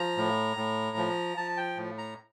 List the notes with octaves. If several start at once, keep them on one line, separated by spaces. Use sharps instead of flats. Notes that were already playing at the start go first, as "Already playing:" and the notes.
Already playing: F3 A#5
A2
A2
F3
F3 A5
G5
A2
A#5